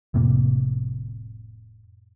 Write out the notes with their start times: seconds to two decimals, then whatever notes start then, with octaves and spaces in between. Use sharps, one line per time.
0.14 F1 A2 C3 A#3